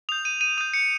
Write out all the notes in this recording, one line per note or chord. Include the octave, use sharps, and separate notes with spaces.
D#6 G6 F7
D#7
D#7
D#6 G6 D#7
C#7